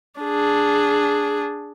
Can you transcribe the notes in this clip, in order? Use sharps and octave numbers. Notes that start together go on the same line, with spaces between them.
D4 G#4